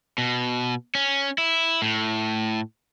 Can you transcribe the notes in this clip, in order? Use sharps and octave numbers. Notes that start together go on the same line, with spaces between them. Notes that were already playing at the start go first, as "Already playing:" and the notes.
B2
C#4
E4
A2